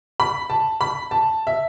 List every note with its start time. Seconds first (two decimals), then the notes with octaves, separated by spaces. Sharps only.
0.20 B5
0.50 A5
0.81 B5
1.11 A5
1.47 E5